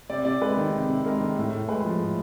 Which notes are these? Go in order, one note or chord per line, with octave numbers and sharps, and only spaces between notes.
C3 D5
C3 D5
G#3 B4
D#3
C3
C3
G#3 A#4
D#3
A2
A2
G#3 B4
F3
A2